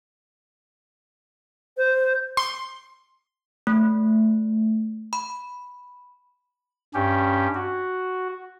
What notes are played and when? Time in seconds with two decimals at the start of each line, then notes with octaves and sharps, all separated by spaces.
1.77 C5
2.37 C6
3.67 A3
5.13 B5
6.94 G2 C#4 G4
7.55 F#4